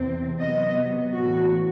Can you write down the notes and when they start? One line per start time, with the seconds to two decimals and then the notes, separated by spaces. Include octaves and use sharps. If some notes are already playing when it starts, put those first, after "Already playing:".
Already playing: E2 C3 C4
0.39 C3 F#3 B3 D#5
1.14 A2 E3 B3 F#4